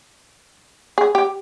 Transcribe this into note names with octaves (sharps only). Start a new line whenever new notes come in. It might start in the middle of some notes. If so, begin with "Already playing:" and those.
G#4
G4